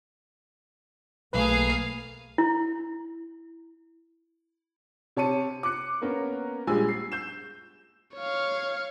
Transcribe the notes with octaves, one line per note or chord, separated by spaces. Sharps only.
B1 A3 A#3 G#4 B4 F5
E4
C3 C#5 A5 C#7 D#7
D6 F#6 C#7
A#3 B3 C#4 A#4
A#1 G3 G#3 G#5 E6
C7
G6 E7
C#5 F5